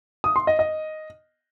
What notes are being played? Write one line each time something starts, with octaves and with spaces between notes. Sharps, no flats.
D#6
C6
D#5
D#5